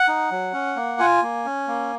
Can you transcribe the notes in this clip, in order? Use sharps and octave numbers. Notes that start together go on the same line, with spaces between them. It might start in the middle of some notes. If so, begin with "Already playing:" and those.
Already playing: F#5
D#4
F#3
C#4
A#3
F4 G#5
A#3
C#4
A#3